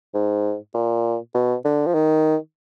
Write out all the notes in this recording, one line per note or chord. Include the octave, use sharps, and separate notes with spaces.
G#2
A#2
B2
D3
F3
D#3